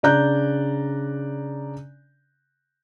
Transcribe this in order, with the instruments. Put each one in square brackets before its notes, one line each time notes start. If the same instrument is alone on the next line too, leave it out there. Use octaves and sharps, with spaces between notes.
[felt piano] C#3 D4 D5 A#5 F#6 G6